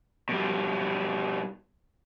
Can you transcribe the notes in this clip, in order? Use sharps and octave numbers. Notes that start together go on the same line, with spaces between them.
B2 G3